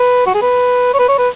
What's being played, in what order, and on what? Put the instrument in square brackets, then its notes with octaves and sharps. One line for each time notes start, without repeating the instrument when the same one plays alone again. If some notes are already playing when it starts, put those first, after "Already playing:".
Already playing: [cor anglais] B4
F#4
G#4
B4
C#5
B4
C#5
B4